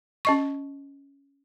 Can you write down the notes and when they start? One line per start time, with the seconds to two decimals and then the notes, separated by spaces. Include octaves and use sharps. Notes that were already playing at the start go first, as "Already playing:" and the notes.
0.25 C#4 D#5 C#6